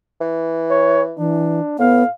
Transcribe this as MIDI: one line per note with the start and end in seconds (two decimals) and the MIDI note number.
0.21 1.18 52
0.70 1.03 73
1.18 1.61 52
1.18 1.75 62
1.79 2.03 45
1.79 2.03 59
1.79 2.12 77